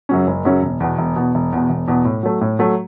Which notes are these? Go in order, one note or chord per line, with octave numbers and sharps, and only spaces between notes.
F#2 C#3 F#3 C#4
F#1
F#2 C#3 F#3 C#4
E1
E2 B2
E1
E2 B2
E1
E2 B2
E1
E2 B2
A2
F#3 A3
A2
F#3 A3